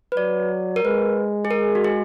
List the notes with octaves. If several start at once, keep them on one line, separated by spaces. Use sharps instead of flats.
B4
F#3 D5
A#4
G#3 B4
G#4
A#4
F#4
G#4